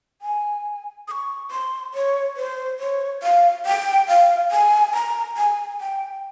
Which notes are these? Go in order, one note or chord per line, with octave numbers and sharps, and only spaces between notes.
G#5
D#6
C#6
C6
C#5
C5
C#5
F5
G5
F5
G#5
A#5
G#5
G5